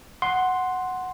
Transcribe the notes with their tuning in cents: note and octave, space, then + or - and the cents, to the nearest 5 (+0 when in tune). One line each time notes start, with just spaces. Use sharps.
F#5 +0 C6 +0